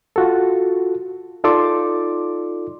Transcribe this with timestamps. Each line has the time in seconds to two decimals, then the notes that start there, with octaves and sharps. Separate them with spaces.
0.16 F4 F#4 A4
1.44 D#4 F4 A4 D5 C6 D6